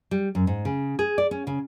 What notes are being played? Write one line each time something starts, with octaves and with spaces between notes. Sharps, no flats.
G3
F#2
G#2
C#3
G#4
D5
C#4
C#3